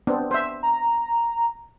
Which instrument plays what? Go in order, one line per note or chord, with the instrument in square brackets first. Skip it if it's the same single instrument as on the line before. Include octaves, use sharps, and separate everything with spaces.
[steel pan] B3 C4 D4
C5 E5
[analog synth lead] A#5